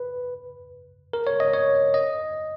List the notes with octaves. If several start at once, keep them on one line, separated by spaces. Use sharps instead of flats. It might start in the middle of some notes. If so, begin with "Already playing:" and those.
Already playing: B4
A#4
C#5
D#5
C#5
D#5